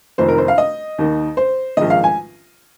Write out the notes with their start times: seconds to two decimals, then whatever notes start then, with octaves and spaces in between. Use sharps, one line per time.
0.18 F1 F2 D#3 C5
0.28 A#4
0.38 C5
0.48 F5
0.58 D#5
0.98 D#2 D#3
1.37 C5
1.77 A#1 G#2 D#3 D#5
1.90 F5
2.04 G#5